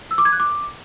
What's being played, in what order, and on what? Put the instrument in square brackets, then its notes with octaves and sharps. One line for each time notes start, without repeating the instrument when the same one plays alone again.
[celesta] E6
D6
G#6
F#6
D6